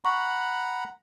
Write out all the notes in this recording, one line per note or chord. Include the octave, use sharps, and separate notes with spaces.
F#5 A#5 B5 C#6